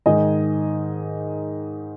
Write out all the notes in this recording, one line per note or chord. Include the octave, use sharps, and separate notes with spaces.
G#2 D#3 D#5 G#5